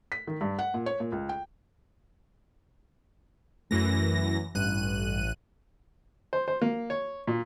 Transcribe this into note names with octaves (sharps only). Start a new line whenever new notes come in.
B6
D#3
G2
F#5
A#2
C#5
A#2
C#2
G5
F#2 E3 A3 A#6
A1 G2 F#6 D#7
C5
C5
A#3
C#5
A#2